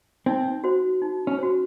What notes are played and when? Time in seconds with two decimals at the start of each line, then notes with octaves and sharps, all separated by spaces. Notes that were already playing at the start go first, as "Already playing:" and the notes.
0.26 C4 D#4
0.64 F#4 C5
1.02 D#4
1.27 C#4
1.39 F#4 C5